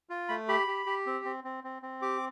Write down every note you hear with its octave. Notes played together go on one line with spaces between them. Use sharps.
F4
A3 B5
G4 B5
G4
G4
C4
C4
C4
C4
C4
G4 D6